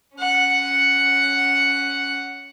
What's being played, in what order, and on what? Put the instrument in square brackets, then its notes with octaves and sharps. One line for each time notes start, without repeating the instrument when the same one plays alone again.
[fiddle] C#4 F#5